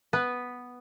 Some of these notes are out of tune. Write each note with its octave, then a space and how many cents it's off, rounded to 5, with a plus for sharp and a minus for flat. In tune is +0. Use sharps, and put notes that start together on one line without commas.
B3 +0 B4 +0